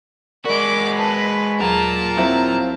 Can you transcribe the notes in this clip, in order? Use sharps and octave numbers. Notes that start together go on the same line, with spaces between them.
G#3 F#4 A#4 D5 B5 D6
B4 A5
D#2 F#3 F4 G#4 A#4 A5 A#5
F#3 C4 E4 E5